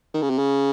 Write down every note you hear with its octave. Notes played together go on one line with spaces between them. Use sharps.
D#3
C#3
C3
C#3